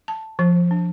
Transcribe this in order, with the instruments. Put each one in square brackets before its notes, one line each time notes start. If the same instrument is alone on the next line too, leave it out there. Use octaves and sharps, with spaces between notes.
[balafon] A5
F3
D4